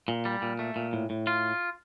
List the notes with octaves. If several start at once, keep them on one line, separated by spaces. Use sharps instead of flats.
A#2
G3
A#2
A3
A#2
A2
A2
F4